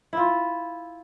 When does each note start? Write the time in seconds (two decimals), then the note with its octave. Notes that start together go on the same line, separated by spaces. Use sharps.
0.13 E4 F4